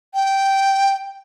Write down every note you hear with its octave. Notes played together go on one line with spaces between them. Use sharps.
G5